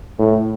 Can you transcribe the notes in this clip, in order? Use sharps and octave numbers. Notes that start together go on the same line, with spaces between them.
A2